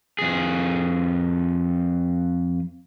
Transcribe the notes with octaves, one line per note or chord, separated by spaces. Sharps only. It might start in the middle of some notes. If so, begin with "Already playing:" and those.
F2 G#4